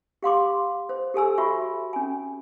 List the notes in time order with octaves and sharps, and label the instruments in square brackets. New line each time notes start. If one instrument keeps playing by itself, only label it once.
[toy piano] G4 F5 C6 D6
C5
G4 A4 G#5 E6
F#4 E5 B5 C#6
C#4 G#5